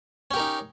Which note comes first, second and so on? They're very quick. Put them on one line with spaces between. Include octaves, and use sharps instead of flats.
C#4 G4 A#4 D#4